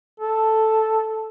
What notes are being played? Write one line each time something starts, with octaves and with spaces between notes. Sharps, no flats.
A4